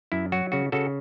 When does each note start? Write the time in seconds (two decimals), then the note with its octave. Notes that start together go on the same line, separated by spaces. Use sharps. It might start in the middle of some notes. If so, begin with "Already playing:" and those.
0.12 F#2 E4
0.32 F#3 F#4
0.52 C#3 F#4
0.72 C#3 F#4 A4